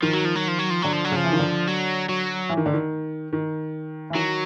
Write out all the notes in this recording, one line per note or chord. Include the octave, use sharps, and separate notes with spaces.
D#3 F3
F#3
F3
F#3
F3
F#3
F3
D3 F#3
F3
F#3
C#3 F3
E3
D#3
D3
F#3
F#3
E3
D#3
D3
D#3
D#3
E3
D#3 F#3